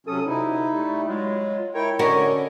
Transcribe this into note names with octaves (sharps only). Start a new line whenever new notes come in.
C3 F#3 C#4 A4 D#6
D2 C3 D#4 E4
G3 A3
F#3 G#3 F4
E4 A#4 C#5 G5
D3 C#4 D4 F#4 A#4 C#5 D#5